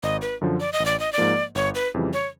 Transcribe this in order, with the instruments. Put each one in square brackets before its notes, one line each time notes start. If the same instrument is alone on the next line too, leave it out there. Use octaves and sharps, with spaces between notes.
[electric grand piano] G#1 [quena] D#5
[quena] B4
[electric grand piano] F#2 D3 F3
[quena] D5
D#5
[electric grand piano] A1
[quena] D5
D#5
D5
[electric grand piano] G#2 F3 A#3
[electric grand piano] G1 [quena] C#5
[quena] B4
[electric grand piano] F2 C#3 E3 G3
[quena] C#5